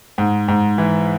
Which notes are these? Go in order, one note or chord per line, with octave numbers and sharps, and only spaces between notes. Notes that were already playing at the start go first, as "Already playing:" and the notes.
G#2
G#2
E3